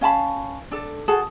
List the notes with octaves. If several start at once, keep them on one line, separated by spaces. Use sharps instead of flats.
C#4 F5 A5 B5
D4 A4
F#4 G#4 A4 A5